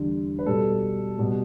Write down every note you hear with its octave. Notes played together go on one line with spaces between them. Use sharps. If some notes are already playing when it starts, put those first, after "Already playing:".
Already playing: E2 D3 G3
B4
B2 G3 A4
B2 G3